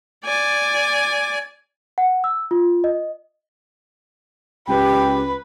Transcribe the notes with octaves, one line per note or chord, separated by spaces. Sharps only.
D5 G#5
F#5
E6
F4
D#5
C#2 G4 B4 G5